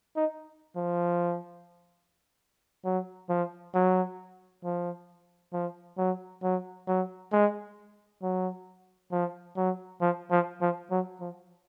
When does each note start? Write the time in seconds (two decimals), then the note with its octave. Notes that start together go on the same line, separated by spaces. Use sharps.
0.16 D#4
0.76 F3
2.85 F#3
3.30 F3
3.74 F#3
4.64 F3
5.53 F3
5.98 F#3
6.43 F#3
6.88 F#3
7.32 G#3
8.22 F#3
9.12 F3
9.57 F#3
10.01 F3
10.31 F3
10.61 F3
10.91 F#3
11.20 F3